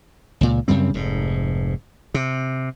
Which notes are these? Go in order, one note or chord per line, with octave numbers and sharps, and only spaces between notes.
C#2 A#2
F#2 C#3 G3 C4
F1 G#2
C3